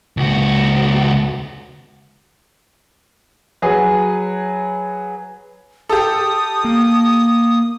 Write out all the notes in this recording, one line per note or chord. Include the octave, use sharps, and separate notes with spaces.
C#2 F#4
F#3 G#4 B4
G4 A4 D#6
A#3